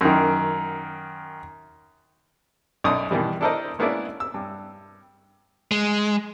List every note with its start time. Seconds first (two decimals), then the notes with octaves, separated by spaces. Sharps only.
0.01 F#2 D#3
2.84 B1 F#2 D4 D#4 C#6 D#6
3.11 B2 D#3 E3 G3
3.41 D4 E4 A4 A#4 C5 D#5
3.79 G#3 A#3 B3 C#4 D4 E4
4.20 E6
4.34 G2
5.71 G#3